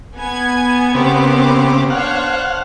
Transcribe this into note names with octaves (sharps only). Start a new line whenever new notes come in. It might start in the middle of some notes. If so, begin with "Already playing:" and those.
B3 G#5 G#6
C#3 A#3 C4 G4 D6
D4 C5 C#5 F5 F#5